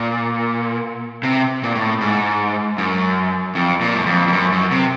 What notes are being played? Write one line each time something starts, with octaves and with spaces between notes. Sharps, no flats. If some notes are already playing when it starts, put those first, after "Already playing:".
Already playing: A#2
C3
A#2
A2
G#2
F#2
F2
A#2
F#2
F2
F2
F#2
F#2
C3